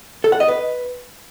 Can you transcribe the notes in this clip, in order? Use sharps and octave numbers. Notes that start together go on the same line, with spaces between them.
A4
F#5
D#5
B4